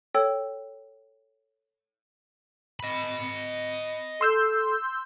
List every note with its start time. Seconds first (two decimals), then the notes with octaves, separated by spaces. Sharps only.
0.15 A4 C#5 G5 E6
2.80 D#5 B5
4.21 A4 C6 E6 G6